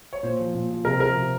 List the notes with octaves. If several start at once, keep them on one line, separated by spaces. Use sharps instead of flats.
C#5
A#2 C5
F3
A#2
F3
C3 A#4
F3 A#4
C3